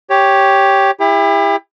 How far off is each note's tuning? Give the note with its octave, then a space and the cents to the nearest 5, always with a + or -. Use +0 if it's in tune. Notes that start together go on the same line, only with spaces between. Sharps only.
G4 +0 C#5 +0
E4 +0 G4 +40